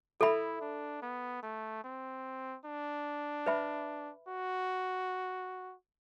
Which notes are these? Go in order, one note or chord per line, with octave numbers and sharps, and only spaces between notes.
E4 A4 E5 B5
D4
B3
A3
C4
D4
B4 E5 B5
F#4